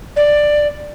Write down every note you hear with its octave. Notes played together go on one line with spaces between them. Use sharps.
D5